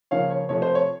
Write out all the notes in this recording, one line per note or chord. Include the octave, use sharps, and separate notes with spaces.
C#3 F3 A#3 C#5 F5
C#5
C3 F3 A3 C#5
C5
C#5